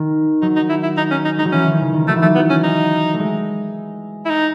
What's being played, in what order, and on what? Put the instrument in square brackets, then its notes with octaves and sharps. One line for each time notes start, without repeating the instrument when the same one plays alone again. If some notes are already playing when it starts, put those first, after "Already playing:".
Already playing: [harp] D#3
[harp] F#3 [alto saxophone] D#4
[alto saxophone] D#4
E4
E4
D#4
C#4
D#4
[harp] G#3 [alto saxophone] D#4
[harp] F#3
[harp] E3 [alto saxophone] C#4
[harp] D#3
C#3
D#3
[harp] F#3 [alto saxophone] A3
[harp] E3
[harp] F#3 [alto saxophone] A3
[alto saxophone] B3
C#4
D#4
[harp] A3
G#3
[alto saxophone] E4
D#4